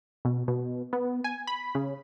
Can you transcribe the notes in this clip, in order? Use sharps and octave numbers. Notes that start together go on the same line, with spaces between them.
B2
B2
B3
G#5
B5
C#3